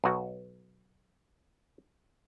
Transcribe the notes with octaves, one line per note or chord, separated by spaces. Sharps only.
B1 F#4